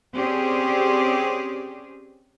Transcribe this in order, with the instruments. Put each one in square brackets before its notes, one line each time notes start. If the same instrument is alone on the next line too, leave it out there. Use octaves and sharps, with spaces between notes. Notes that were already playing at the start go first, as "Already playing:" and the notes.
[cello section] C4 C#4 G4 G#4 D5